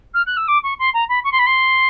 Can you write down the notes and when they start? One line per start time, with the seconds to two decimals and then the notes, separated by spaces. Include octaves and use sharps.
0.14 F6
0.26 F#6
0.37 E6
0.47 D6
0.63 C#6
0.79 C6
0.93 A#5
1.09 B5
1.24 C#6
1.32 C6
1.38 B5
1.46 C6